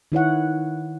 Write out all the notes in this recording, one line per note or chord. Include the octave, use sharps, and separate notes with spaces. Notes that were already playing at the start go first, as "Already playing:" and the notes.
D#3 E4 C#5 F#5